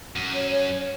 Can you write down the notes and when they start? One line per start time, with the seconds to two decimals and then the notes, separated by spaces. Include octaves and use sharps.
0.16 F#2
0.35 C#5
0.50 C#5